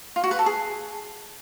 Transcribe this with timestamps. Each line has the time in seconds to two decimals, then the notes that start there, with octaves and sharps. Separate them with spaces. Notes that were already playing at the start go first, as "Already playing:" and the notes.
0.16 F4
0.24 F#4
0.31 B4
0.39 A4
0.46 G#4